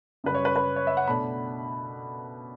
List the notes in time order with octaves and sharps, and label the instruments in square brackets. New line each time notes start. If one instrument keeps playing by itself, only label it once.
[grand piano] F#2 C#3 G3 B4
C#5
B4
B4
C#5
E5
F#5
B2 A3 D4 B5